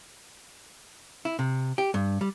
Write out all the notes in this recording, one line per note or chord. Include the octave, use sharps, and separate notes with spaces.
E4
C3
G4
G2
G3